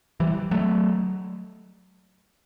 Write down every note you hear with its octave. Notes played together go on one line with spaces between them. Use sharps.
E3 G3
F#3 A3